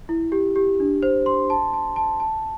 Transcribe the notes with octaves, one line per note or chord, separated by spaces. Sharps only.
E4
G4
G4
D4
C5
C6
A5
A5
A5
A5